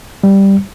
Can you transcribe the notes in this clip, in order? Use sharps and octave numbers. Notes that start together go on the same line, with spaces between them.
G3